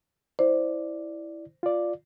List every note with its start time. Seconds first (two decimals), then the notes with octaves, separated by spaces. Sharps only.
0.39 E4 C5 D5
1.63 F4 D5